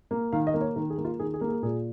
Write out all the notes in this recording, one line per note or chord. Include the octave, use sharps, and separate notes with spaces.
A#3
D#3 F5
D#5
A#3
C#5
D#3 A#4
G#4
A#3
F4
D#3 G#4
G#4
A#3
G#4
A#2 G#4